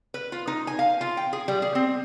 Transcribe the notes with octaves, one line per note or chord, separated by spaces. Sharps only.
B4
F4
D#4
G#5
F5
F4
G5
G#4
G3
G#4
C4